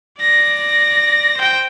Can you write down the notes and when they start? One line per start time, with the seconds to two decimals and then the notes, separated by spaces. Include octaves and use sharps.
0.20 D5 A#6
1.37 C5 G5